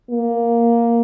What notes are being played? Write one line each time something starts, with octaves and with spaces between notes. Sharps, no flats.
A#3